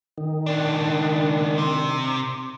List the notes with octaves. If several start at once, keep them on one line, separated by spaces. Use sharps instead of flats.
D#3
C#2 D4
C3